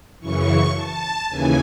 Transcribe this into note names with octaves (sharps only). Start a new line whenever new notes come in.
F#2 C#3 E3 C#6
A5
D#2 C#3 E3 G#5